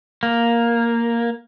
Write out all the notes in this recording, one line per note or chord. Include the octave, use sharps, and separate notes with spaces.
A#3